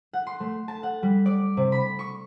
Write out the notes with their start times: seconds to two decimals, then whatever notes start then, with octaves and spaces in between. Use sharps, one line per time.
0.13 F#5
0.27 C6
0.40 A3
0.68 A5
0.83 F#5
1.03 G3
1.26 D5
1.57 C3
1.72 B5
1.99 C#6